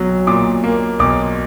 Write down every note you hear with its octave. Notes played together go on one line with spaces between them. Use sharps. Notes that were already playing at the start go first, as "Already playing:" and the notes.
Already playing: B1 F#3
A#2 D6
A#3
B1 D6